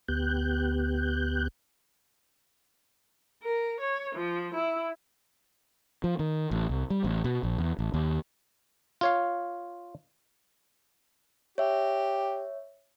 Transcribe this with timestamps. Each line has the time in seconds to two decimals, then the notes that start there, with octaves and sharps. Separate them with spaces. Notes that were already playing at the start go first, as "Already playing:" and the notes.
0.08 D2 B3 G4 F#6 G6
3.42 A#4
3.79 C#5
4.14 F3
4.53 E4
6.04 F3
6.19 D#3
6.51 A1
6.70 C2
6.90 G3
7.04 A1
7.24 B2
7.43 A#1
7.58 E2
7.79 A1
7.94 D#2
9.01 F4 C#5 F5
11.58 G4 C#5 E5